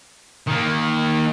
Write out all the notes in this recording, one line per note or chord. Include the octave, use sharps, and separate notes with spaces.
D#3 A#3